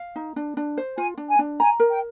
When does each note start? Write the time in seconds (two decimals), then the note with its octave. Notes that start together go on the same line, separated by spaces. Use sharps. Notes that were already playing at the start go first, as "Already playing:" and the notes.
Already playing: F5
0.16 D#4
0.36 D4
0.57 D4
0.77 C5
0.97 F4 G#5
1.17 D4
1.29 G#5
1.39 D4
1.60 G#5 A#5
1.80 A#4
1.90 G5